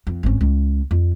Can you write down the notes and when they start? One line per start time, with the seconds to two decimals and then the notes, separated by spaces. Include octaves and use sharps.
0.07 F2
0.23 G#1 C#4
0.41 C#2
0.91 F2